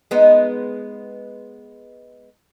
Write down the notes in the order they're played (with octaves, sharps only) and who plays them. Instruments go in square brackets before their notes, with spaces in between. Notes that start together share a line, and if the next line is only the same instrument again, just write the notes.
[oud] G#3 B3 D#4